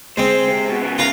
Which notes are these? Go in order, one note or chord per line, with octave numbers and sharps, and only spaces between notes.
G#3 C4 C5
C3
B2 B3
C#3 B3
F4 F5 A#5